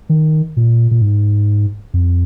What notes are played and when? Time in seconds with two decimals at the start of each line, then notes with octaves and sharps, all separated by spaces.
0.09 D#3
0.57 A#2
0.91 A#2
1.02 G#2
1.94 F2